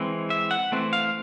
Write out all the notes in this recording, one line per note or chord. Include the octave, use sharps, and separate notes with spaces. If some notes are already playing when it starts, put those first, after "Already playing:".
Already playing: E3 G#3 C4
E5
F#5
E3 A3 C4
F5